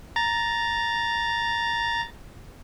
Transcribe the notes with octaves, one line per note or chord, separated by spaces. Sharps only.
A#5 A6